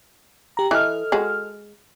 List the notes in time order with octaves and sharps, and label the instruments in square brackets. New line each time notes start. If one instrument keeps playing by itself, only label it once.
[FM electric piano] G4 A#5
[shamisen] E3 [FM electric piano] A4 D#5 F6
[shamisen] G#3 F#4